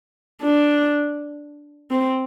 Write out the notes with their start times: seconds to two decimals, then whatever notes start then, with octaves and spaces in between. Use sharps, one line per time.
0.42 D4
1.91 C4